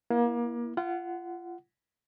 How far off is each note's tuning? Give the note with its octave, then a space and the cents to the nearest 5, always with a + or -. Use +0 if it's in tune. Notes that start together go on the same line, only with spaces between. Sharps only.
A#3 +30 E4 +0
F4 -25 F#5 +10